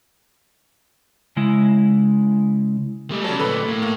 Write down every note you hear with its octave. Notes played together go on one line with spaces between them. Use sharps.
C#3 G#3 E4
G3 A3
C#3 F#3 G3 A4
D2 A#2 A4 B4 B5
A2 A#3
A#3